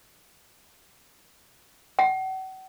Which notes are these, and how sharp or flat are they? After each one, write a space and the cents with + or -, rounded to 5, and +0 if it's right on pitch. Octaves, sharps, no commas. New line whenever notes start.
F#5 +40